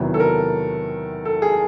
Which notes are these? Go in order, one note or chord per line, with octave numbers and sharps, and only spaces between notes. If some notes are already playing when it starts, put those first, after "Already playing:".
Already playing: E2 C3 D#3 F#3 B3
A4
A#4
A4
G#4